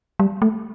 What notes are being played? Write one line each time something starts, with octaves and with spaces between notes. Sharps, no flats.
G3
A3